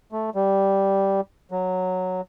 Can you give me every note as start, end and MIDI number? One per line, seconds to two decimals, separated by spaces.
0.12 0.30 57
0.35 1.21 55
1.51 2.21 54